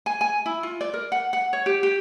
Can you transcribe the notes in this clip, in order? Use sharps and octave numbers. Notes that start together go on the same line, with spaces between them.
G#5
G#5
E4
F4
D5
A#4
F#5
F#5
C#5
G4
G4